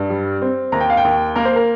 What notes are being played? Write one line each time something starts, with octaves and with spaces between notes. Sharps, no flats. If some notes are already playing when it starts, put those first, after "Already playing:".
Already playing: G2
G3
C4
D#2 A#5
G5
F5
G5
D#2
A#3 A#4
C5
A#4